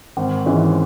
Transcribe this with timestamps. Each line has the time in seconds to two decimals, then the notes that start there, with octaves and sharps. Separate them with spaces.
0.17 G#1
0.46 G#2 E3 C#4 E4